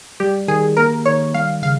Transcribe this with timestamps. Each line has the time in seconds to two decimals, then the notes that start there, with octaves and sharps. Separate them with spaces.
0.20 G3 G4
0.48 D#3 G#4
0.77 A#3 A#4
1.06 D#3 C#5
1.34 G3 F5
1.62 C#3 F5